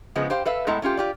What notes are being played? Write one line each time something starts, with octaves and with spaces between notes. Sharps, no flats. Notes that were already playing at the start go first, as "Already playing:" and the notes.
C#3 F3 G#3 B3
G4 C5 F5 G5
A4 B4 E5 F5
A2 G#3 B3 E4 A4 A#5
A3 C#4 F4 G4
F4 G4 D5